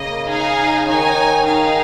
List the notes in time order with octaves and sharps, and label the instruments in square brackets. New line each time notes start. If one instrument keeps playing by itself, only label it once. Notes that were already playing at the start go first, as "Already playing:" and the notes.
Already playing: [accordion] C#3 [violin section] A#3 D#5
[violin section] D#4 G#4 F5 G#5
[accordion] D#3 [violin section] D#4 C#5 G#5
[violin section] D#4 G#4 F5